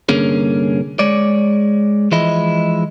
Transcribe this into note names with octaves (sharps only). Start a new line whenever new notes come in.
C2 G2 D3 A#3 C#4 G#4
G#3 C#5 D5
E3 F3 G#3 E4 D#5